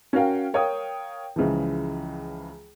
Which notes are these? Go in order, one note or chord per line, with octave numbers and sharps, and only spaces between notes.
C#4 F#4 A#4 F5 G5
A#4 C#5 F5 G5 D#6
C#2 C#3 E3 F3